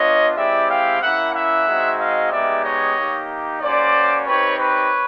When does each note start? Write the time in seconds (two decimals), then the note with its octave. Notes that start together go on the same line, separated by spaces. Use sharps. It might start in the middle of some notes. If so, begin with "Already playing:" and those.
Already playing: B3 D4 F4 C#5 D#5
0.37 G#3 C4 E4 G4 D5 E5
0.70 F5 G5
1.02 A#3 C#4 E4 E5 F#5
1.35 E5 F#5
1.67 G#3 C4 D#4 F#4
2.00 D#5 F5
2.32 G#3 B3 D#4 G4 D5 E5
2.64 C#5 D#5
2.97 A#3 D#4 G4
3.62 A#3 C#4 F#4 C5 D5
4.27 C4 D#4 G4 B4 C#5
4.59 B4 C#5